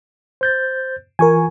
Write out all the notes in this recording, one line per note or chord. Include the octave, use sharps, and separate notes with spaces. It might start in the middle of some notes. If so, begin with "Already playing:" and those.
C5 G6 A6
E3 F4 A#4 G#5 C#6